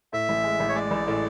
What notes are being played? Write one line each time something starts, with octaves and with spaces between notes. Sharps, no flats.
A2 E5
A1
G#3
A1
C#5
G#3 D5
A1
A2